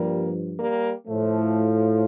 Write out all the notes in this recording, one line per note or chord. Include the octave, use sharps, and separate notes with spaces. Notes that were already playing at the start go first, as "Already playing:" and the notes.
Already playing: G2 F3 G3 A#3
G3 A#3
A2 F3 A3